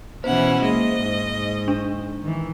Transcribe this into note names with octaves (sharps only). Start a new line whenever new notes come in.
B2 E3 C#4 E4 C5 F#5
G#3 A#3 D#5
G#2
D4
D#3 E3